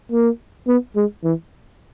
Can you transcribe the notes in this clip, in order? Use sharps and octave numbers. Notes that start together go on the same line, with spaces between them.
A#3
B3
G#3
E3